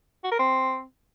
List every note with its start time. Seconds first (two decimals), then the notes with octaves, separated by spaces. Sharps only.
0.24 F#4
0.31 A#4
0.39 C4